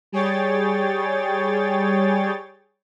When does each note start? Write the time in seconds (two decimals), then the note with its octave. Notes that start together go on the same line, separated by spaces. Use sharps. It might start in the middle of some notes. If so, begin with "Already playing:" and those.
0.12 G3 G#4 C#5 G5 A6